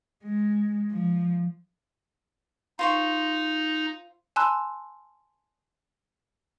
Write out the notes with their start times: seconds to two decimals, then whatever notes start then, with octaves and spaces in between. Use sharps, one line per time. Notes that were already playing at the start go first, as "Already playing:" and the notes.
0.24 G#3
0.92 F3
2.79 D#4 F4 C5 C#6
4.36 G#5 A5 B5 C6 E6 F#6